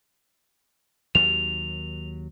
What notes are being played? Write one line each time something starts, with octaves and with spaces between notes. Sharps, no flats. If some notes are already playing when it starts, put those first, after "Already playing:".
D#2 F#3 F7